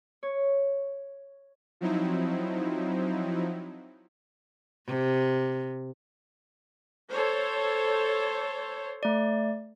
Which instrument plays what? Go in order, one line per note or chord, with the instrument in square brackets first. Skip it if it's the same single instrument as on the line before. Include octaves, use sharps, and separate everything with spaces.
[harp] C#5
[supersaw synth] F3 F#3 C4 D#4 E4
[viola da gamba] C3
[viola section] A4 C5 C#5
[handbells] A3 D5